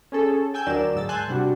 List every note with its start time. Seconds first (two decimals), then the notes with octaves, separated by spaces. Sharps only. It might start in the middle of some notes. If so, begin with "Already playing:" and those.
0.12 C#4 G#4 A4
0.54 G5 G#5 E6 G6
0.67 D2 F#3 D4 A#4 D5 E7
0.95 G#2 E6 A6
1.09 G#5 A5 C6 E6 F#6 G6
1.28 C3 G3 D4 F#4